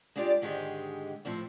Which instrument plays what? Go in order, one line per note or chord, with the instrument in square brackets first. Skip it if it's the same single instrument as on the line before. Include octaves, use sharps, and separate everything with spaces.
[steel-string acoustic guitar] G#3 D4 F4 G4 D5
G#2 D3 D#3 G#3 G4 C5
F2 A2 F3 C4